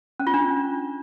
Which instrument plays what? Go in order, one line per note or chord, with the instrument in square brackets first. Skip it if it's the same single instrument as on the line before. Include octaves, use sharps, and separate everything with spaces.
[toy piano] C#4
F4
D4